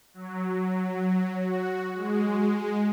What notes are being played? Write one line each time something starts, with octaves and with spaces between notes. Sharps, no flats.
F#3
F#4
G#3